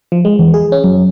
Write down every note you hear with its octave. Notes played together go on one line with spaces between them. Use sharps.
F3
G#3
E2
G#4
C#4
F#2